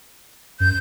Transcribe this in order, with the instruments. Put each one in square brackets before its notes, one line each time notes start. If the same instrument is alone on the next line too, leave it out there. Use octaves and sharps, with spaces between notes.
[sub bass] F#2 [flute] G6